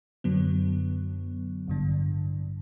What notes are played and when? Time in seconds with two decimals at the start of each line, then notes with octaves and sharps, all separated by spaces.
0.24 F#2 D3 F#3 B3
1.67 A1 G2 D3